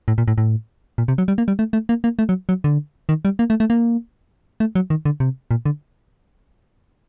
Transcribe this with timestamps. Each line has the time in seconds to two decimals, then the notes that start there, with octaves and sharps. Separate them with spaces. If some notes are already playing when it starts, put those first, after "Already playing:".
0.08 A2
0.18 A#2
0.28 A2
0.38 A2
0.98 A#2
1.08 C3
1.18 F#3
1.28 G3
1.38 A#3
1.48 G3
1.59 A3
1.73 A3
1.89 A#3
2.04 A#3
2.19 A3
2.29 F#3
2.49 F#3
2.64 D3
3.09 D#3
3.25 G3
3.39 A#3
3.50 A3
3.60 A3
3.70 A#3
4.60 A3
4.75 F#3
4.90 D#3
5.05 D3
5.20 C3
5.51 A#2
5.66 D3